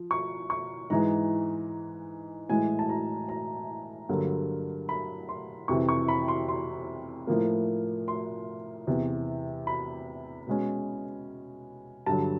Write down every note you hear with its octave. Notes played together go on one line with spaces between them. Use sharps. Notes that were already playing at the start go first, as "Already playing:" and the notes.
Already playing: F3
C#6
C#6
G#2 E3 G#3 A#5
A2 E3 G#3 G#5
A5
A#5
A#5
G2 D3 F#3 A#3
B5
C6
F2 C3 E3 C#6
C#6
B5
C6
C6
A2 F3 A#3
C6
E2 C3 E3
B5
B2 G#3 C#4
G2 D3 F#3 A5